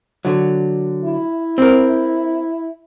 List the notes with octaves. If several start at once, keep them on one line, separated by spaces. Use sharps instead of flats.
D3 F#3
E4
C4 A#4